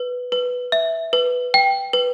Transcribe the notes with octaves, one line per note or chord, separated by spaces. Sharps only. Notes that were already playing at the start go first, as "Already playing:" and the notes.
Already playing: B4
B4
E5
B4
G5
B4